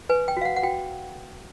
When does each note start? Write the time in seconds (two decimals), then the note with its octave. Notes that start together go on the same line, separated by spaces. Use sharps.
0.09 B4 G#5
0.28 G5
0.37 F#4 F5
0.45 F#5
0.56 F#5
0.63 F#4 G5